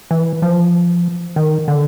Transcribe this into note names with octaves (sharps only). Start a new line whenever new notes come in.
E3
F3
D#3
D3